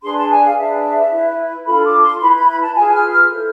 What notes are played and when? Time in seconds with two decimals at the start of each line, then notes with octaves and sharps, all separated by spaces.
0.02 D4 G#4 B4 C6
0.16 A5
0.30 G#5
0.44 F5
0.57 D4 G#4 B4 E5
1.11 E4 B4
1.66 D4 F4 A4 B5
1.84 D6
2.02 C6
2.20 E4 B4 B5
2.29 C6
2.34 B5
2.48 B5
2.61 A5
2.75 F4 G#4 B4 G#5
2.93 F6
3.11 F6
3.30 E4 A4 C5